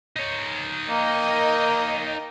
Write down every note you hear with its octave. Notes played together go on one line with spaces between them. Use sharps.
D#4 C#5
A#3 A#4 D#5 G5